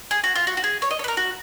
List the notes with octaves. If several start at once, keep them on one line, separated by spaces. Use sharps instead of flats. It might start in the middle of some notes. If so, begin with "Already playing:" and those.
G#4
F#4
F4
F#4
F#4
G#4
C#5
D#5
C#5
B4
A#4
F#4